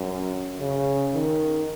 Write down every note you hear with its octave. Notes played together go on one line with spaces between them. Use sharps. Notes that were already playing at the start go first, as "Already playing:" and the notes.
Already playing: F#2
C#3
D#3